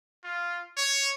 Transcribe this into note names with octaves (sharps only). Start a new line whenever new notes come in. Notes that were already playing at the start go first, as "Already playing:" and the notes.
F4
C#5